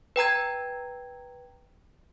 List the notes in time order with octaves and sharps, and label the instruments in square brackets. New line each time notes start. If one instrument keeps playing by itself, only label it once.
[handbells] B4 G5 A#5 G#6